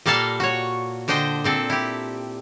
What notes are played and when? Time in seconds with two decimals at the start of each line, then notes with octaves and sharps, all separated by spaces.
0.06 A#2 G3 A#3 A4 F5 A5
0.40 F#4 C#5
1.08 D3 D4 C5 D#5 G5
1.44 A#2 C4 A4
1.70 E4 G4